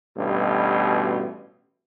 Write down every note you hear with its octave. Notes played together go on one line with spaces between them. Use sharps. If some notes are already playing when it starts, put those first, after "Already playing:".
A1 G2 B2